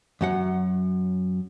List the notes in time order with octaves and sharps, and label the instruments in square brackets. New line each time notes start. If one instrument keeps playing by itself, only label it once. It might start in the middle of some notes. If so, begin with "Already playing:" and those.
[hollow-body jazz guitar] F#2 F#3 F#5